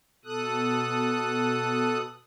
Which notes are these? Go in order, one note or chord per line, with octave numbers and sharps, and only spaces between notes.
B2 A4 D#6 F#6